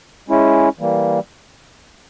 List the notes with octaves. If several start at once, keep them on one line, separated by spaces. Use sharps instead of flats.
G#3 C#4 E4
E3 G3 A#3